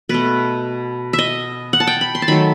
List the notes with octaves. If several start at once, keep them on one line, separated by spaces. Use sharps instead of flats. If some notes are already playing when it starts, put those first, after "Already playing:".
B2 A3 B4
E5
D#5
F#5
A5
G5
B5
C6
A5
D#3 F#3 A3 B5